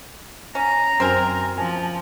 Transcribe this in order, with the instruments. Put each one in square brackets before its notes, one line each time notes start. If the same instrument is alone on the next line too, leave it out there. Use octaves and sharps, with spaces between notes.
[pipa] C#4 [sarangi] A#5
[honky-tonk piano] F#2 G#5 [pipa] C4 A#4
[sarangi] F3 [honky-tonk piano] G#5 A5